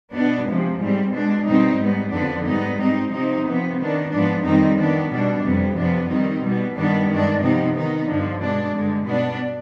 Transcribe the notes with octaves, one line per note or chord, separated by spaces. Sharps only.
B2 B3 D4
C3 F3 G#3
G#2 G3 C4
B2 G#3 D4
B2 G3 C4 D#4
G#2 G3 B3
F2 D3 F3 B3 D4
G#2 G3 B3 D#4
G#2 G3 C4 D#4
C3 F3 C4 D#4
C3 F3 B3
D#3 B3 D4
G#2 F3 B3 D4
F2 D#3 G3 C4 D#4
D#3 B3 D4
B2 G3 D4
F2 C3 G3 B3
F2 C3 F3 B3 D4
D#3 G3 C4 D#4
B2 G3 B3
G2 D#3 G3 B3 D4
G2 D#3 G#3 D4
C3 F3 B3 D#4
D#3 B3 D#4
G2 D3 F3
B2 G#3 D4
G2 D3 G#3
B2 B3 D4